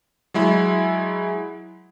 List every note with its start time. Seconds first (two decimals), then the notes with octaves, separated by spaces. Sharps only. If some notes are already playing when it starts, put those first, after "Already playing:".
0.34 F#3 G#3 E4